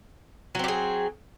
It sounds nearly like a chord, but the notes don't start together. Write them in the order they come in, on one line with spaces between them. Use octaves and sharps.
F#3 C4 G4 G#4